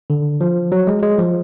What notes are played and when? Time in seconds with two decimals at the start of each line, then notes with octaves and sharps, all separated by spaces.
0.10 D3
0.41 F3
0.72 F#3
0.87 G#3
1.02 G#3
1.18 F3